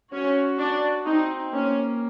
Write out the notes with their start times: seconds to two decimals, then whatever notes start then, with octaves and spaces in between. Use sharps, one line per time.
0.12 C#4 F#4
0.58 D4
1.05 C4 D#4
1.52 A#3 C#4